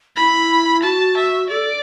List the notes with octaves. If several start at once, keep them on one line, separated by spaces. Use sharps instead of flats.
E4 B5
F#4 A5
E5
A4 D5